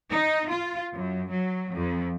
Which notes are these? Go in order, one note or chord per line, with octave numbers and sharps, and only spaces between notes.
D#4
F4
F#2
F#3
F2